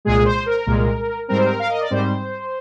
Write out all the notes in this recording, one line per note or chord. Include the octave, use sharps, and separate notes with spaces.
C2 A#2 G#3 G#4
C5
A#4
C2 A#2 G#3
G#2 G3 C4 A#4
C5
A#4
F5
D#5
D5
G#2 G3 C4 C5